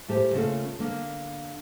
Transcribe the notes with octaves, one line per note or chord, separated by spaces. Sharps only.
A2 A3 G4 C5 G#5
C#3 A3 A#3 C#4 F4 A4
D3 A#3